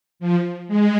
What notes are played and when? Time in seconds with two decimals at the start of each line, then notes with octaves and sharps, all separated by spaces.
0.19 F3
0.68 G#3